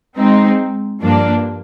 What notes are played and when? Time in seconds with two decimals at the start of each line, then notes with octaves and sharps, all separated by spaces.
0.17 G#3 C4 D#4
1.00 G2 F3 A#3 D4